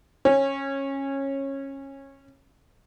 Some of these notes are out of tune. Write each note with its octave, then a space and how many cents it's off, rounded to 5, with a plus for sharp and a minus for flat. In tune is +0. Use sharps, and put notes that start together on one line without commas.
C#4 -20